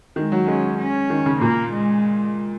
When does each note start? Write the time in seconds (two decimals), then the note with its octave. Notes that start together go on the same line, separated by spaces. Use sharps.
0.16 D#3 G#3
0.32 F#3
0.47 G#3 C#4
0.78 C#4
1.10 D#3
1.26 C#3
1.41 A#2 A#3
1.72 G#3